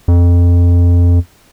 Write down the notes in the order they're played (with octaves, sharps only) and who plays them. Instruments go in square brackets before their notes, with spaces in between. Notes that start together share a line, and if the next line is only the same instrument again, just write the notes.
[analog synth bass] F2